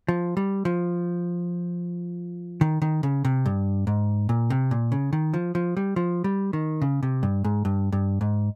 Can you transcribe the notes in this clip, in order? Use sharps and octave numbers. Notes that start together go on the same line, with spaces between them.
F3
G3
F3
D#3
D#3
C#3
C3
G2
G#2
A#2
C3
A#2
C#3
D#3
F3
F3
G3
F3
G3
D#3
C#3
C3
G2
G#2
G2
G2
G#2